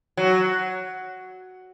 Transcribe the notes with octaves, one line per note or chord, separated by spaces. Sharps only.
F#3